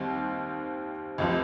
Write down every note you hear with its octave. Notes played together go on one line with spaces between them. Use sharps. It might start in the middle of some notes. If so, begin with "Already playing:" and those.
Already playing: D#2 D#3 G3 C4
C#2 C3 F3